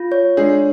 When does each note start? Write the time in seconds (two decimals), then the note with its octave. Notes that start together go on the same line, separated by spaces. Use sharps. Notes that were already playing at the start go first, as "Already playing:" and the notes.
Already playing: F4
0.12 C#5
0.37 G#3 D4 G#4